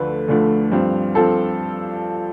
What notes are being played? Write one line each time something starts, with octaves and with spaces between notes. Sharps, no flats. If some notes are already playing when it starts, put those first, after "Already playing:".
Already playing: D2 D3 F3 A3 B4
D2 D3 F3 A3
G2 F3 C4
F3 C4 A4